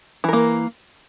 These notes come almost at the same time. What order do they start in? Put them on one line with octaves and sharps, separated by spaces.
E3 A#4 A#3